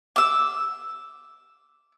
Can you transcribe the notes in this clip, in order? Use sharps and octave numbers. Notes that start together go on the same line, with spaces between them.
D6 E6